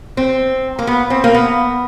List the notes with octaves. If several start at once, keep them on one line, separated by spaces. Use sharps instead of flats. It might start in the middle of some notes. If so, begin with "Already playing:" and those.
C4
A#3
B3
C4
A#3
B3